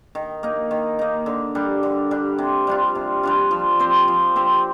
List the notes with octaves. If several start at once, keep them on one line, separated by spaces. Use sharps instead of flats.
D#3
A#3 D#4
D#3
A#3 D#4
D3
G3 D4
D3
G3 D4
C3
G3 D4 F4
C3
G3 D4 F4
F3
C4 G4 C5
F3
C4 G4 C5